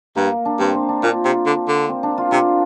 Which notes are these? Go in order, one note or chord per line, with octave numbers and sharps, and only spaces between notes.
G2 A#3
D4
G2 C4
C4
D4
A#2 F4
C3
D3
D3
C4
D4
F4
C3 D4